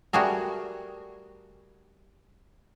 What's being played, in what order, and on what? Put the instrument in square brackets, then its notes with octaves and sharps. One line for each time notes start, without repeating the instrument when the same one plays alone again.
[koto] G3 A3 F#4 G#4 A#4